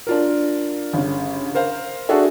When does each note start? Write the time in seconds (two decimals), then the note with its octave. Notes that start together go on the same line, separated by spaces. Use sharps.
0.07 D4 F4 A#4
0.93 G1 C#3
1.55 A#4 C5 F5
2.09 D4 F#4 G#4 A4 E5